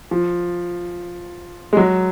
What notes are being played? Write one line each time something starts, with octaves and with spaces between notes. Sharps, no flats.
F3
G#3
F#3